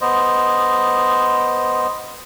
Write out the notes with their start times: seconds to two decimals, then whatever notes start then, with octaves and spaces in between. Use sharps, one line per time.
0.01 B3 C5 D#5